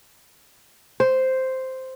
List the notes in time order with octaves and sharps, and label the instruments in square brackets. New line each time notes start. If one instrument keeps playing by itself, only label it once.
[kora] C5